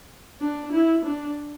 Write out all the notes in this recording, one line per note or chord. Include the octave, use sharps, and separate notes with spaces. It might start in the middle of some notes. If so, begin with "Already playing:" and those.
D4
E4
D4